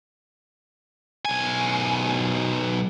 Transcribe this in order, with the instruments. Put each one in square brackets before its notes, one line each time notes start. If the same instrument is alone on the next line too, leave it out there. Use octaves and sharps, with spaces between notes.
[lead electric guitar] B1 G#5